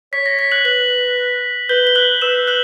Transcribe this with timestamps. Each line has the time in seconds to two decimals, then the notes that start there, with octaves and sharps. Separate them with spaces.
0.13 C#5 B6
0.26 A#6
0.39 B6
0.51 F#6 F#7
0.65 B4 F#6 F#7
1.69 B4 G6 G7
1.87 G7
1.95 F#6 F#7
2.22 B4 E6 E7
2.47 F#6 F#7